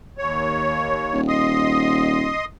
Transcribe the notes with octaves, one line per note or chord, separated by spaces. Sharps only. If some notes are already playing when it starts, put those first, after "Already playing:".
D#2 C#5
D#1
D#5 C6 D#6